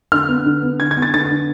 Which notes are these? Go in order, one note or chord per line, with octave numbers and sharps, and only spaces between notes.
D3 F6
B3
D3
B3
D3 G#6
G#6
B3
A6
D3 A6
D3